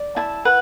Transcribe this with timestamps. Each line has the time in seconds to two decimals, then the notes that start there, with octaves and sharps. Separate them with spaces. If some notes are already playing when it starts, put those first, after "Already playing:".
Already playing: D5
0.16 E4 A5
0.45 B4 F#5